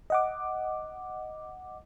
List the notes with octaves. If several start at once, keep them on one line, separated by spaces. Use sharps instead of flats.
D#5 F#5 D6